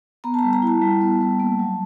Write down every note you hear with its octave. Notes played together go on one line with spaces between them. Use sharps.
B3 A#5
A5
G3 A#5
A#5
E4 A5
G3
B3
G3
A#3
F#3